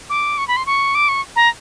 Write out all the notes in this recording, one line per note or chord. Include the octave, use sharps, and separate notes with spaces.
D6
C#6
B5
C6
C#6
D6
C#6
A#5